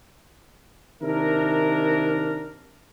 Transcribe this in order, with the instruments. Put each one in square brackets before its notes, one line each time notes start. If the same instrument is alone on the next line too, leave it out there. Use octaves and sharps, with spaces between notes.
[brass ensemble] C3 D#3 D4 E4 A#4